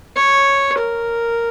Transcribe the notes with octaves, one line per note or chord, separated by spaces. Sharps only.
C#5
A#4